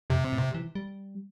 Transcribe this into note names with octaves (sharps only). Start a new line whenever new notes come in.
F2 C3
A2
E3
G3